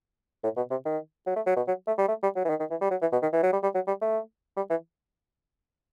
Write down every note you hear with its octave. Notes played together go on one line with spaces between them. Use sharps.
A2
B2
C3
D#3
F#3
A3
F#3
B2
F#3
A3
G3
A3
G3
F#3
E3
D#3
D#3
E3
G3
F#3
E3
B2
D#3
E3
F#3
G3
G3
F#3
G3
A3
G3
E3